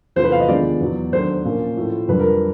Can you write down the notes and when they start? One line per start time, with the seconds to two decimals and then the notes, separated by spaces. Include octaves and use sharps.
0.16 E2 C3 F3 A3 C5
0.24 B4
0.32 F5
0.40 D#5
0.48 D#2 D3 F3 G#3 B3 D5
0.80 E2 B2 F#3
1.12 D#2 D#3 F#3 A3 D4 C5
1.45 A#2 F3 A#3 C#4
1.77 A2 F3 A3
2.08 F2 D3 G3 B4
2.19 A#4